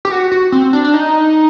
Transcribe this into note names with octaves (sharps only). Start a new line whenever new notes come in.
G4
F#4
F#4
C4
D4
D4
D#4